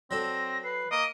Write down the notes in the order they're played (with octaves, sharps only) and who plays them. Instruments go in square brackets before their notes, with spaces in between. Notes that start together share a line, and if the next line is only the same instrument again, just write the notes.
[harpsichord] F#3 D4 A4 [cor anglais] C4 [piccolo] A#6
[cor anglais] B4 [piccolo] C7
[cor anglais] A#3 [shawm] D#5 [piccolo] D7